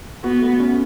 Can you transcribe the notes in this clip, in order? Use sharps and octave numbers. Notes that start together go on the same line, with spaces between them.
B3 F#4
A3
C#4